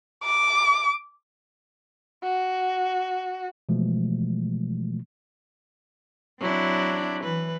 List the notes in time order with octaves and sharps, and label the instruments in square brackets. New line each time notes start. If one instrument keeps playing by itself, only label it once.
[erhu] D6
[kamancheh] F#4
[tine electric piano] B2 E3 F3 G#3 A3
[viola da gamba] F#3 D4 [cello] C4 E4
[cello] E3 [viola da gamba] B4